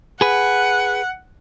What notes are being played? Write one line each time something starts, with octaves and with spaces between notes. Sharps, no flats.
G#4 B4 F#5